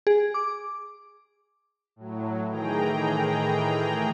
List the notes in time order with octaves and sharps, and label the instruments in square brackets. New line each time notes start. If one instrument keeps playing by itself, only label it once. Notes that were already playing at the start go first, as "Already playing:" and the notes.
[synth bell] G#4
D6
[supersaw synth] A2 F#3
A2 D#3 E3 G#4 G5 A#5